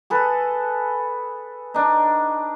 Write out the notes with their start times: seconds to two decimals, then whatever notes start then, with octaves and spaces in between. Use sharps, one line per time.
0.10 G#4 A4 B4
1.74 D4 D#4